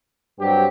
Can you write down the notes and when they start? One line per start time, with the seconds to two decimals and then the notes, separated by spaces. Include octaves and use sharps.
0.38 G2 F#3 C4 G4